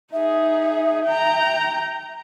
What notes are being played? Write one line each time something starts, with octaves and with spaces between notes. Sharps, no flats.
D#4 G#4 E5
G5 A#5